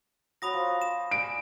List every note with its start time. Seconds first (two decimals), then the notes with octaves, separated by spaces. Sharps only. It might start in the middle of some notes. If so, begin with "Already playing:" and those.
0.42 F#3 F#4 B5 D#6 A#6
0.53 F3
0.82 E7
1.11 D5 G#5 D7